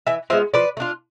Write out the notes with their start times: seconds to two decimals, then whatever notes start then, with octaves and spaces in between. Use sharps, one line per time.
0.07 E3 E5 G#5
0.30 G#3 B3 F4 C5 E5
0.54 F3 B4 D5
0.77 A3
0.80 D4 F4